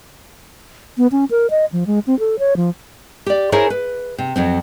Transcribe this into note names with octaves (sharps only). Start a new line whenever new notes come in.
B3
C#4
A#4
D#5
F3
G#3
C4
A4
C#5
F3
G4 D5
C#4 E4 G#4 A#4 C5 C#5
B4
C3
F2 F#3 C4